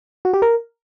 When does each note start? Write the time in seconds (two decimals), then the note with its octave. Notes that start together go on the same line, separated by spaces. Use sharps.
0.25 F#4
0.33 G4
0.42 A#4